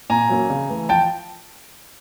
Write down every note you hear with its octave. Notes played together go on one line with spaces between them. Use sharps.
A#2 G#5 A#5
F#3 A#3 C#4
C#3
E3 A3
F3 G5 A5